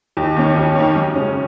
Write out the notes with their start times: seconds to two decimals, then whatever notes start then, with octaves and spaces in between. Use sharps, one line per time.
0.17 D#2
0.36 D#3 A#3 C#4
0.56 D#2
0.76 D#3 A#3 C#4
0.96 F#2
1.15 C#3 G#3 C#4